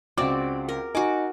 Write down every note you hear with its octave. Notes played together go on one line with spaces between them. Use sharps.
C#2 C4 F#4 D5 D6
A#4
D#4 F#4 G#5 D6